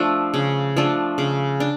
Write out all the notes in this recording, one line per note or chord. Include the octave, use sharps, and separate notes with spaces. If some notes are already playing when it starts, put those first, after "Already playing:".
Already playing: F3 A3 D4
C#3
F3 A3 D4
C#3
D4